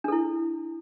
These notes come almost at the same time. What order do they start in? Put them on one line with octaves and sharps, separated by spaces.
D4 A4 E4